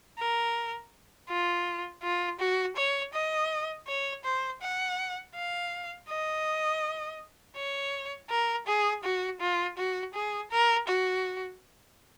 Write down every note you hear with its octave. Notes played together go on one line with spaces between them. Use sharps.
A#4
F4
F4
F#4
C#5
D#5
C#5
C5
F#5
F5
D#5
C#5
A#4
G#4
F#4
F4
F#4
G#4
A#4
F#4